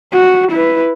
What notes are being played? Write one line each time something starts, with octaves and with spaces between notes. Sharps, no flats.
F#4
E4 B4